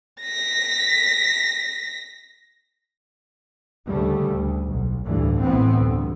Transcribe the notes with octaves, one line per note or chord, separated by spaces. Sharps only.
A#6 B6
D2 C#3 G3 A3
D2
B1
A1 D2 G2 E3
A1 A2 E3 B3 C4
D2 G2